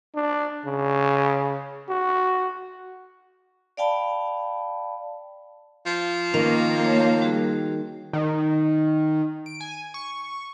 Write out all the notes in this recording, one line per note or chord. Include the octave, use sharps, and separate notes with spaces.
D4
C#3
F#4
D5 F5 G5 A5 B5
F3
D#3 A#3 C#4
C#5 A5
G3 F#4 G#4
D#3
D7
G#5
C#6